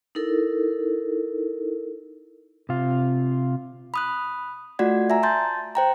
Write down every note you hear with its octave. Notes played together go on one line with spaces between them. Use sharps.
D#4 E4 A4 A#4
C3 F4
B5 D#6 F#6
A3 F4 F#4 D5 F#5 G#6
E5 G#5 A#5
A5 C6 G6 A6
C5 G5 A#5